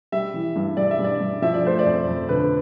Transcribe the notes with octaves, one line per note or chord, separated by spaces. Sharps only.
G3 E5
E3
G2
G2 D5
E5
G2
D5
G2
F3 E5
D5
A3 C5
D5
F2
F2
D3 B4